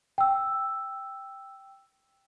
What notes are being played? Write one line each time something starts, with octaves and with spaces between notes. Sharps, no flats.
G5 E6